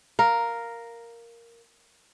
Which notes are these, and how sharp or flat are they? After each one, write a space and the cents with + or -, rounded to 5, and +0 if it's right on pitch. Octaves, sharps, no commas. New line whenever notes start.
A#4 +0 F5 +0